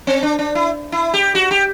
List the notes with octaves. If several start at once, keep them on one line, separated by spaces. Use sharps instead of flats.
C4
D4
D4
E4
E4
G4
F#4
G4